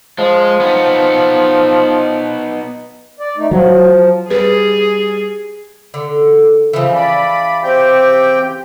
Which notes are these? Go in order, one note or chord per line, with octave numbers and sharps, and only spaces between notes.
F3 G#3
B3 D#4
D5
A3 D#4
F3 F#3
G3 G#4 B4
D3
C#3 E3 F3
D5 B5
C4 G4 G5